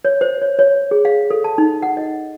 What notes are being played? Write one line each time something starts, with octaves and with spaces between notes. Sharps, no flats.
C#5
C5
C#5
C#5
G#4
F5
A4
A5
D#4
F#5
D#5